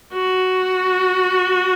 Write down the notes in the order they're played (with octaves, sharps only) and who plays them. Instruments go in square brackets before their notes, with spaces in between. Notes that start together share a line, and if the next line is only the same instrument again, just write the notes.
[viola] F#4